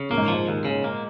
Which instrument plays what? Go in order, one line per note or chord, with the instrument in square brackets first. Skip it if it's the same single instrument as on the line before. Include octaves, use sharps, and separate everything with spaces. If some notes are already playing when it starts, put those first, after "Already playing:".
Already playing: [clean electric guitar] C#3
[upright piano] A#2 [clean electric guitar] A#3
[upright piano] G#2
[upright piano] G#2 [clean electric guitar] F3
[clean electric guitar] D#2
C#3
A#3